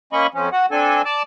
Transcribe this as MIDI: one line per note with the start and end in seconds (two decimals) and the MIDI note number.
0.13 0.27 58
0.13 0.27 61
0.13 0.27 75
0.13 0.27 83
0.13 0.27 85
0.34 0.49 41
0.34 0.49 53
0.34 0.49 61
0.52 0.66 66
0.52 0.66 78
0.71 1.02 60
0.71 1.02 62
0.71 1.02 69
0.71 1.02 80
1.05 1.22 74
1.05 1.22 81
1.05 1.22 86